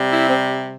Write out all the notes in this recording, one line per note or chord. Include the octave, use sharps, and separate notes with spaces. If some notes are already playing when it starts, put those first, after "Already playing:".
Already playing: C3 G3
E4
C4